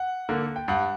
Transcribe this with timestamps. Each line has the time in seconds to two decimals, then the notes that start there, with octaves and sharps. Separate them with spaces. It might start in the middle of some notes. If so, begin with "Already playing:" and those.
Already playing: F#5
0.29 D3 A#3
0.56 G5
0.68 G2 F#5